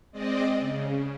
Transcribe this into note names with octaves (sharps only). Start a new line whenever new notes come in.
G#3 C4 D5 D#5
C#3